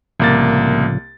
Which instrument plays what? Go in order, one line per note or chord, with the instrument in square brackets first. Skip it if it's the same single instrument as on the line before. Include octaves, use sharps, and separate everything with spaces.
[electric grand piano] C2 A#3 A6 [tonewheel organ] A2 C#3 F3